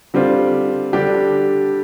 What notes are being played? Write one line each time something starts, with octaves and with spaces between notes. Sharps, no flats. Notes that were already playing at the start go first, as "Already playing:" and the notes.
D3 G3 C4 F4
D3 G3 D4 G4